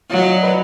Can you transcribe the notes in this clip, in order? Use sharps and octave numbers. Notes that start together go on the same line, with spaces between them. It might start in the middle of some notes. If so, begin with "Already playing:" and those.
F#3 F5
D#5
D5
B4 D#5